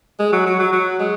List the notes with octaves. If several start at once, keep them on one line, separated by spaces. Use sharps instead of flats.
G#3
F#3
F#3
F#3
F#3
G#3